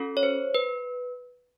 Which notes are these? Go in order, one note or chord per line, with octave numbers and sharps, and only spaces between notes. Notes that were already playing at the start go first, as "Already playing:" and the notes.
Already playing: C#4 F#4 A4
C#5
C5
B4